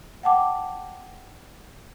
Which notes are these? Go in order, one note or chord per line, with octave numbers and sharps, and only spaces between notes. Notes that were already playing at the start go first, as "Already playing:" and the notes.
F#5 G5 A5 D6